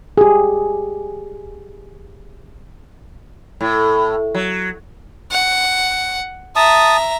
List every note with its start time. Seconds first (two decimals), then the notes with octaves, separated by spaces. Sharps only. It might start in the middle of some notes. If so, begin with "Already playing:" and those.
0.18 G4 G#4
3.61 A2
4.35 F#3
5.31 F#5
6.56 E5 A5 A#5 D#6